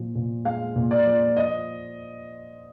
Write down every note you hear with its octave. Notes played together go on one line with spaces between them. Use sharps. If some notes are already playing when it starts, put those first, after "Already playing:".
Already playing: A#2 F3
A#2
G#3 F5
A#2
D5
F3
D#5